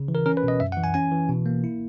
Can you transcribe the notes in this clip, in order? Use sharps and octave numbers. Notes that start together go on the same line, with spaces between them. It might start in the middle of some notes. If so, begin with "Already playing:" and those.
Already playing: C#3
E3
A#4
C#4 A#4
B4
B2
D#5
F#2 E5
F#5
E3
G#5
C#4 G#5
E3
B2
A#3
E4